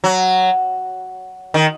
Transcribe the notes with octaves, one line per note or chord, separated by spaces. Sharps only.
F#3
D#3